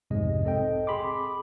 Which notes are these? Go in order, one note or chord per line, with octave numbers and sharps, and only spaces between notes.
B1 F2 G#2 C3 G#3 D#5
C4 A4 D#5 G5
G#4 B5 C6 D6